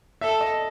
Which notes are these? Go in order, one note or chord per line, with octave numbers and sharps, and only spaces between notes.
A4 E5
D#5